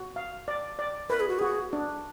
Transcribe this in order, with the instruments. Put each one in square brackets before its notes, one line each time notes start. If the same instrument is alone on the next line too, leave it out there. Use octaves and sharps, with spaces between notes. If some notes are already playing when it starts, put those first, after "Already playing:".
Already playing: [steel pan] F#4
F5
D5
D5
[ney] A#4 [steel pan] B4
[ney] G#4
F#4
[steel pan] F#4 [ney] G#4
[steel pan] D4